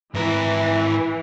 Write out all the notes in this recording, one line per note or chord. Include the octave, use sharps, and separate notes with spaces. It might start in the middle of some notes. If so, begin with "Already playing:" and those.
G#2 E3 A#4